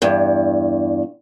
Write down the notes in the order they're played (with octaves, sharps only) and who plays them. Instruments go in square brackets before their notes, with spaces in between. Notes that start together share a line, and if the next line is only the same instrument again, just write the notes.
[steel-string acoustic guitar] E2 G2